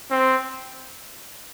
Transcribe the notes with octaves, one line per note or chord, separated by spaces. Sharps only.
C4